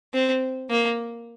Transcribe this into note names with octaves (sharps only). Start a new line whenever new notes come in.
C4
A#3